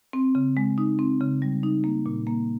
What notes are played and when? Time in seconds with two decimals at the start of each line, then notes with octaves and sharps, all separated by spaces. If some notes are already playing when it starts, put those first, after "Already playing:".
0.13 C4
0.35 C#3
0.57 G#3
0.78 D#4
0.99 C4
1.20 C#3
1.42 G3
1.63 D#4
1.84 A#3
2.06 A#2
2.27 A#3